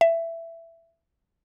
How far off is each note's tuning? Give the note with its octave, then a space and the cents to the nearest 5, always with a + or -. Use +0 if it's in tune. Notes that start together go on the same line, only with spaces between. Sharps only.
E5 +15